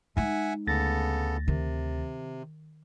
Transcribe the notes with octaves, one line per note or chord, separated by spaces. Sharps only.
G#3 D#4 E5 F#5 G#5
D2 C#3 B3 A4 A6 A#6
C3 D#3